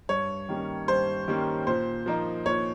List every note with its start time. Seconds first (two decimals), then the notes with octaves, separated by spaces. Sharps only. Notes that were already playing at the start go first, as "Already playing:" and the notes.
0.09 G2 C#5
0.49 D#3 G3 A#3 C#4
0.88 G2 C5
1.28 D#3 G3 A#3 C#4
1.67 A#2 C5
2.06 F3 A#3 D#4
2.46 A#2 C#5